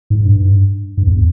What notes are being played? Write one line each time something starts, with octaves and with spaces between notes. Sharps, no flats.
G#2
G2
G2
E2